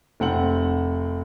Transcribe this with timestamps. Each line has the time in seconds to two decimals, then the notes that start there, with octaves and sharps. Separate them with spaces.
0.20 F1 C4 F#5 F#7